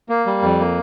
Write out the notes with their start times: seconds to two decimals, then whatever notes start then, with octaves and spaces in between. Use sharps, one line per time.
0.09 A#3
0.26 G3
0.42 F2
0.59 A#3